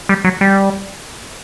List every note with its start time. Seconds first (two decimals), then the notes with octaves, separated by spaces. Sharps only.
0.09 G3
0.24 F#3
0.41 G3